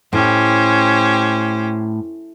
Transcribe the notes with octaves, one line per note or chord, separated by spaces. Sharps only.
A2 C#4 G4 C5